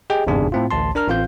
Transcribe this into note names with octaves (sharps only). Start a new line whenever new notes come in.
G4 G#4 D#5 G5
G1 E2 G#2 C3 D4 G#4
A2 C4 F4
A1 D2 A5 C6
D4 A#4 A#5 F6
A1 C4 F4 F5 G6